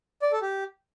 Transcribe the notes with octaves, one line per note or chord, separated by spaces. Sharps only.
D5
A4
G4